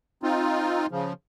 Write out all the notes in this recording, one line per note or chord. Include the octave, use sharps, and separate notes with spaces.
C4 D#4 F4
C#3 F3